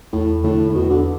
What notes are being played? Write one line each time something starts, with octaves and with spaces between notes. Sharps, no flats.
E2 A2
A2 D3 A3 D4
A2
E2 B2
D3